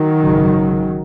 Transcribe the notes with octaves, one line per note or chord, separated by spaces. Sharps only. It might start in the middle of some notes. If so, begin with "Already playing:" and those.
Already playing: D#3 F#3
G#1 F#2 C#3